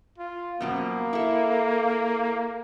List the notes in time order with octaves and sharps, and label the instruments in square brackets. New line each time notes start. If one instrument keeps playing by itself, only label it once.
[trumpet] F4
[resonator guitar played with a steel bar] F#2 B2 F3 [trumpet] A#3
[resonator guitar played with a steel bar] E4 A4